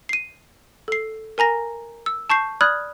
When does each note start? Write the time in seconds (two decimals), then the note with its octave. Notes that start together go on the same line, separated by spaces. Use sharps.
0.09 C7 D#7
0.88 A4 C7
1.38 A#4 G#5 A#5 A#6
2.06 E6
2.30 A5 C#6 G6 C7
2.61 D5 B5 D#6 F6 F#6 G#6